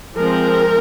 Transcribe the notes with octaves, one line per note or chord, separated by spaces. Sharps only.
F3 G#3 C4 A#4